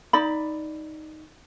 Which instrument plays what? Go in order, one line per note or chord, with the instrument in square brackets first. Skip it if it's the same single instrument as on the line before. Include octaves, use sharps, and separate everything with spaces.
[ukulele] D#4 D5 B5